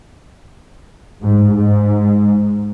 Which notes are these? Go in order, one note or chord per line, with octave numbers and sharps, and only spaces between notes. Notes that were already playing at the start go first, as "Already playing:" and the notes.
G#2
G#2